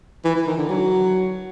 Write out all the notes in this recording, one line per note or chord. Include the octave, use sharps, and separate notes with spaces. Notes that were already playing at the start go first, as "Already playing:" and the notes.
E3
E3
D#3
D3
F#3